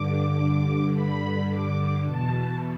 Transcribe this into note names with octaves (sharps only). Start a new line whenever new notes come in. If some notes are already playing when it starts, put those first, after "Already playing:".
Already playing: G2 D3 D6
B5
D6
E2 B2 A5